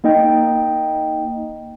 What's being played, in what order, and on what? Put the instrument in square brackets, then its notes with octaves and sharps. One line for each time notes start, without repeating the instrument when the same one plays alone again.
[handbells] A#3 D#4 D#5 G5